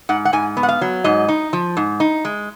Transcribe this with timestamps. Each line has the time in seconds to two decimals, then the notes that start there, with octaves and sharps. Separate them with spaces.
0.09 G#2 F#5
0.25 F#5
0.33 G#2 G#5
0.57 B3
0.63 F#5
0.69 F5
0.81 F#3
1.04 G#2 D#5
1.29 D#4
1.53 F3
1.77 G#2
2.00 D#4
2.25 G#3